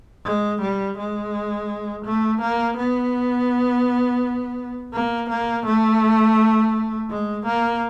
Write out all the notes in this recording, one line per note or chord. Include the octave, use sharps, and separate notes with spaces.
G#3
G3
G#3
A3
A#3
B3
A#3
A#3
A3
G#3
A#3